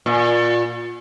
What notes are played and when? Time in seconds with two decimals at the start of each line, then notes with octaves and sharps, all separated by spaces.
0.06 A#2